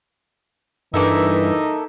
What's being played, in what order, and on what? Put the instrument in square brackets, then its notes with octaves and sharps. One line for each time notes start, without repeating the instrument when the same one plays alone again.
[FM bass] G2 [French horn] E3 [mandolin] A#3 A4 E5 [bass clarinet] D#4